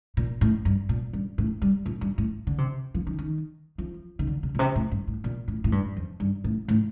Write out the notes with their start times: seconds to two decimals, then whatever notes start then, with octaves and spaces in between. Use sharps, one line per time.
0.17 A#2
0.41 A2
0.65 G2
0.89 A#2
1.13 G2
1.38 A2
1.62 G3
1.86 A#2
2.01 G2
2.18 A2
2.47 D3
2.58 C3
2.94 F3
3.07 D#3
3.19 D#3
3.78 F3
4.19 D#3
4.27 D3
4.43 C3
4.55 A#2
4.59 C3
4.75 A2
4.91 G2
5.07 A2
5.24 A#2
5.48 A2
5.64 A2
5.72 G2
5.97 F2
6.20 G2
6.44 A2
6.68 A2